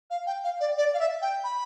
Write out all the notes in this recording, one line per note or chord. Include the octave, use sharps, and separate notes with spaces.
F5
G5
F5
D5
D5
F5
E5
G5
B5